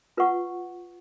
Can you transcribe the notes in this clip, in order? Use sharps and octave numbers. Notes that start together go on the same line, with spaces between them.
F4 B4 F#5 C#6